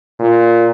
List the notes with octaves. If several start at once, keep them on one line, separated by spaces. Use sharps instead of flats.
A#2